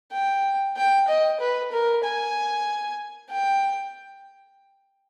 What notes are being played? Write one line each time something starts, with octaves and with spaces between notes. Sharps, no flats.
G5
G5
D#5
B4
A#4
G#5
G5